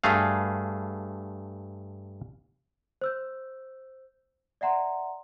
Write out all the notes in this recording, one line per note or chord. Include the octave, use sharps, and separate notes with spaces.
G2 A3 G#4 F5
C5 E6 G6
D5 E5 F#5 A#5 C6